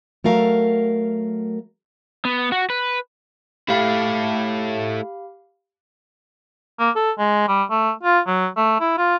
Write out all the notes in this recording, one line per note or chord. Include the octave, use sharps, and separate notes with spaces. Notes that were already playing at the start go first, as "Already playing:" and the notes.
F#3 A3 A#4 F5
B3
F#4
B4
A3 E4 G4 F5 B5
A#3
A4
G#3
G3
A3
F4
F#3
A3
E4
F4